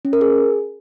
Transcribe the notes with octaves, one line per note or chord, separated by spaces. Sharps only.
C#4
A#4
G#4